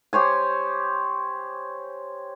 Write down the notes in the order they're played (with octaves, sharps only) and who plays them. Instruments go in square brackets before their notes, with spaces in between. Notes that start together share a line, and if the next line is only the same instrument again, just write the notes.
[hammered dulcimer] G4 C5 C#5 G#5